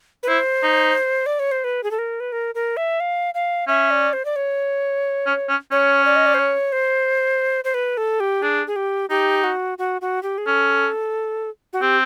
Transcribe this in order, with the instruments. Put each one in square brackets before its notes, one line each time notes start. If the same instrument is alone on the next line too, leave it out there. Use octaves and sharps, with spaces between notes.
[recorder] B4
[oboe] E4 [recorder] C5
[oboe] D#4
[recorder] D5
C#5
C5
B4
G#4
A4
A#4
B4
A#4
A#4
E5
F5
F5
[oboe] C#4 [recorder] E5
[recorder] D5
C5
D5
C#5
[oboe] C#4
C#4
[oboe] C#4 [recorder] C#5
[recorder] D5
D#5
D5
C5
C#5
C5
C5
B4
A4
G4
[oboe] D4 [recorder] G#4
[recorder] G#4
G4
[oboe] D#4 [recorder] G4
[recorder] F#4
F#4
F#4
G4
G#4
[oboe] C#4 [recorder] A4
[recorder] F#4
[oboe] C4 [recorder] G4